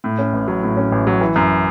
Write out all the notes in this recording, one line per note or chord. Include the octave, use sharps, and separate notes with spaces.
A2
C#4
A1
F#3
A2
C#4
A1
F#3
E3
F#2